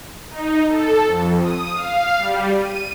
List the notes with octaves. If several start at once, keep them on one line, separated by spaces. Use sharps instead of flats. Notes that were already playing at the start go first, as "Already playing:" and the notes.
D#4
A4
F2
D#6
F5
G3
D#7